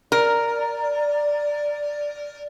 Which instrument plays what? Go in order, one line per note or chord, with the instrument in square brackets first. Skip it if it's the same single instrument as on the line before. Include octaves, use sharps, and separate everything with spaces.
[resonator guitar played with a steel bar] A#4 [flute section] D5